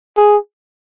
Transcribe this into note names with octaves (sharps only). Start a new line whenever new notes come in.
G#4